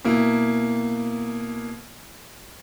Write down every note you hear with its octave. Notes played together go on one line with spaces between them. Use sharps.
B2 A#3 E4